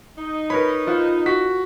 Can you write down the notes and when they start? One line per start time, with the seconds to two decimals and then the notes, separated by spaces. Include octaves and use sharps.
0.17 D#4
0.50 A#4 B4 C#5 B5
0.87 F4 C5 F#5
1.26 F#4 B6